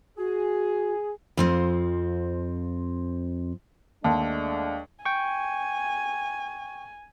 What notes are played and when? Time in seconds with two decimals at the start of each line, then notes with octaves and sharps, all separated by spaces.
0.18 F#4 G#4
1.37 F2 F3 C4
4.04 D#2 G#3 A3 D4 A5
5.05 G5 G#5 C#6